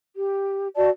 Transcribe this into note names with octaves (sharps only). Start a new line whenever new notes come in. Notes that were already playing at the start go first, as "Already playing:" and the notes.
G4
F#4 D5 D#5 A5